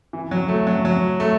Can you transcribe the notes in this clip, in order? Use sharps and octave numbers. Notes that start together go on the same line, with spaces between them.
E3
F#3
A3
F#3
F#3
A3